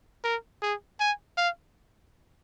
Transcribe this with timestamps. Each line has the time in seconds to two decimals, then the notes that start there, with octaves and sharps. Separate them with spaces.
0.24 A#4
0.63 G#4
1.00 G#5
1.38 F5